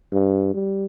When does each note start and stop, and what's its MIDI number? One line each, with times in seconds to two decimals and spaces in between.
0.12 0.53 43
0.54 0.85 55